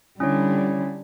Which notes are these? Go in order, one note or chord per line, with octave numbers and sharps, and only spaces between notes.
D3 G3 C#4 E4 C#5